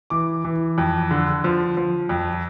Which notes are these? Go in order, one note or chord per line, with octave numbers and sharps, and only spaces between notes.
E3 D6
E3
F2
D3
F3
F3
F2